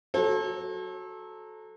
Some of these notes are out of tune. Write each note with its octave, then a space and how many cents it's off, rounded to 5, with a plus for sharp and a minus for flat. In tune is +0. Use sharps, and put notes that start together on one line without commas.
F#3 -5 A4 -15 C#5 -45